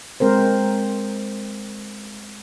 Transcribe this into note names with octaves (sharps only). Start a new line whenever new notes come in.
G#3 C4 A#4 C5